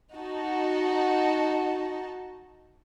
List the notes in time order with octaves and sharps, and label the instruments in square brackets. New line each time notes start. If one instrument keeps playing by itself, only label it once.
[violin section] D#4 F#4 A5